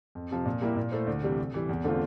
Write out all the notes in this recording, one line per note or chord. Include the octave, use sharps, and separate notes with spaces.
F2
C3 F3
A#2
G3 A#3 E4 G4
A#2
A3 E4 A4 C5
D2
C3 E3 G3
C3
E3 G3
E2
D3 A3 C4 F4